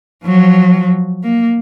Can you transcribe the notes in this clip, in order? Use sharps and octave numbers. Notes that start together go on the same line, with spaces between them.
F3 F#3
A#3